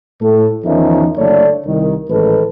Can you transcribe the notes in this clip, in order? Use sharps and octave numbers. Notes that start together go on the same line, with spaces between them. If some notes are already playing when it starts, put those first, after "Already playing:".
A2 A4
E2 D#3 F3 C#4 D#4 E5
F#1 D3 A3 C#5 D5
C2 D#3
A1 G#2 D#3 D#4 A4 B4